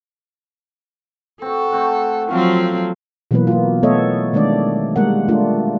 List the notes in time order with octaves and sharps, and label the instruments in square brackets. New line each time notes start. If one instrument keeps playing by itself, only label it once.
[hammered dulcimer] C4 F#4 [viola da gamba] A4
[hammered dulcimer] A3 C4 F#5
[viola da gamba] F3 F#3 C4 [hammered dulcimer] A4 F5 C#6
[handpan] B2 E3 F#3 A#3 B3 B4
A#3 F4
A3 B3 A4 C#5 D#5 E5
D#3 G#3 A3 D4 D5
G3 G#3 A#3 A#4 F#5
A3 D4 F4